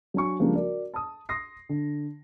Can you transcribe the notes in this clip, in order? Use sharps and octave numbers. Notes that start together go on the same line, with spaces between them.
F#3 D4 G#5 C#6
C#3 F3 G3 G#3 A#3 D4
F#4 A#4 D5
A5 D#6
C6 D#6 A#6 C7
D3